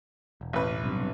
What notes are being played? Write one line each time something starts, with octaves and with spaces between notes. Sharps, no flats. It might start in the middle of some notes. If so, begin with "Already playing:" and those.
E1
A1 B4
B1 G2 C3